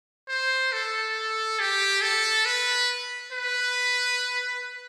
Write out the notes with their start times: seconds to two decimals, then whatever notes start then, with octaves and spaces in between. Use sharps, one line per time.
0.28 C5
0.72 A4
1.60 G4
2.02 A4
2.46 B4
3.32 B4